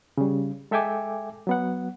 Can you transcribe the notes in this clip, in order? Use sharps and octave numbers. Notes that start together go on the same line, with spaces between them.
C#3 G3
G#3 A4 E5 G5 G#5 D6
F#3 B3 F#5